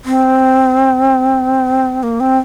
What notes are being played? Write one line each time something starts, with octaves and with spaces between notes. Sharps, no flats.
C4
A#3
C4